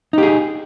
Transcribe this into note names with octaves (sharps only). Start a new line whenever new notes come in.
D#4 G4 G#4